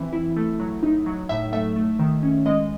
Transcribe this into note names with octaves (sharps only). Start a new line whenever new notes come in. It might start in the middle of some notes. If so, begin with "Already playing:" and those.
Already playing: E3 C4 E5
E4
A3
F#3
D#4
F#3
A2 E5
A3 E5
A3
D#3
C#4
G#3 D#5